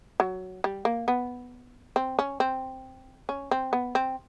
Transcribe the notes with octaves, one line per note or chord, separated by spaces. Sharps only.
F#3
G3
A#3
B3
C4
C#4
C4
C#4
C4
B3
C4